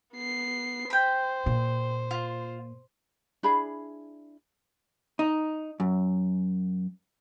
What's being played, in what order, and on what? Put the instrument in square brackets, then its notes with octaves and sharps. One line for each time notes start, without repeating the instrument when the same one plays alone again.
[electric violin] B3 C7
[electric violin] C5 [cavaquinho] G5 B5
[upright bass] A#2
[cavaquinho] F4
[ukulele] D4 E4 G#4 B5
[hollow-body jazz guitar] D#4
F#2